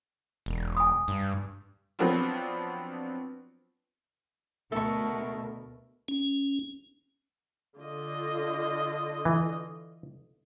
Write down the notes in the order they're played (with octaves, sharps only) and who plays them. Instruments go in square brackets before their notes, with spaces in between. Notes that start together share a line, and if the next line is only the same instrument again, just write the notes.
[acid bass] E1
[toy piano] G#5 D#6
[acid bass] G2
[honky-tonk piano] F3 F#3 B3 C4 D4 F4
[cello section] D2 B2 [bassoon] A3 [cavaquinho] A4 C#6 [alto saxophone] A#4
[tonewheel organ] C#4
[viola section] D3 F4 D#5
[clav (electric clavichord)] E3